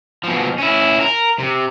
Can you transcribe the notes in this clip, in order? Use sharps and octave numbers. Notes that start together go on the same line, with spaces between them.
B2 F3
C#4 E4
A#4
C3